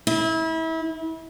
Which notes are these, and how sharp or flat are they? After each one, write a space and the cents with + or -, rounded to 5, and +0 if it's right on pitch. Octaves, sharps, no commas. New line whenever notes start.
E4 -30